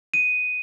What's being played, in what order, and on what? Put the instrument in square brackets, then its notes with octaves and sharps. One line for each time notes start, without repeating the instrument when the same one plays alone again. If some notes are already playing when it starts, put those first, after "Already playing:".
[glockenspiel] D#7